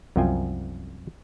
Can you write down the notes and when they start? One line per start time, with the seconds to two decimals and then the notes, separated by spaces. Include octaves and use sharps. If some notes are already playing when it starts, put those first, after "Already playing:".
0.16 C2 F#2 F3 F4 G5 G#5